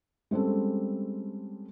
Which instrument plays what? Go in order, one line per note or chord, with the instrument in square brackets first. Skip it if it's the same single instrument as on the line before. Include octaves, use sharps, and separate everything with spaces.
[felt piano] G3 G#3 C4 C#4 A4